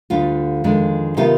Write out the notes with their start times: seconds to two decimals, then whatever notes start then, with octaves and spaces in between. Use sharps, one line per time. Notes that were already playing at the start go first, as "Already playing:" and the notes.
0.10 D2 D3 G3 D4 F4 F5
0.64 F2 D#3 G#3 D4
1.17 C3 D#3 B3 D#4 F4 F5